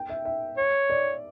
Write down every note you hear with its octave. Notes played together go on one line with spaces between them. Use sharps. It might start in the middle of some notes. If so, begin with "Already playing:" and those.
Already playing: G5
E5
E5
C#5
D5